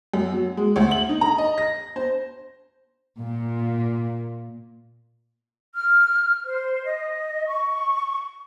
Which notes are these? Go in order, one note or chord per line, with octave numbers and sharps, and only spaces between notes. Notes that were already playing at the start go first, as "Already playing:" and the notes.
F#2
F#3
G#3
D2
F#7
D#4
A#5
D#5
A#6
C5
A#2
F6
C5
D#5
C#6